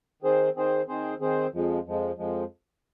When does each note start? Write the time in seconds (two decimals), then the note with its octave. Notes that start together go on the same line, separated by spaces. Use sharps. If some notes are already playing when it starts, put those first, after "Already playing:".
0.22 D#3 C4 G#4 C5
0.56 D#3 C4 G#4 C5
0.88 D#3 C4 G#4 C5
1.20 D#3 C4 G#4 C5
1.53 F2 F3 G#3
1.85 F2 F3 G#3
2.18 F2 F3 G#3